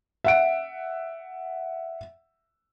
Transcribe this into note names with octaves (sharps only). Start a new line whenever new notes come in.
E5 F#5 D7